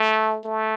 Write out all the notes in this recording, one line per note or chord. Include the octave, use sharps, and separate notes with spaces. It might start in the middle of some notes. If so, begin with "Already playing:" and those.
Already playing: A3
A3